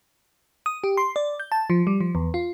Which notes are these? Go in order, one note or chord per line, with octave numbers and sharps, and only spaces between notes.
D#6
G4
C6
D5
G6
A5
F3
G3
F3
E2
F4